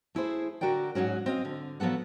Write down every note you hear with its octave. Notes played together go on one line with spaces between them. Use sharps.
A3 E4 G#4 C5
D3 F#4 A#4 D5 G5
G#2 F#3 C#4 F#4
C4 D#5 F5
D3
F3 F#3 B3 A4 F#5